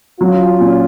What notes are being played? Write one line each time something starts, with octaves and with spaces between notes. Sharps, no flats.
F#3 C#4 F4
A#2